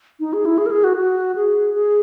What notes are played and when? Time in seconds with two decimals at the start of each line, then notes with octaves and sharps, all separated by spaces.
0.20 D#4
0.33 G#4
0.45 E4
0.58 G#4
0.66 A#4
0.71 G#4
0.84 F#4
0.97 F#4
1.35 G#4
1.74 G#4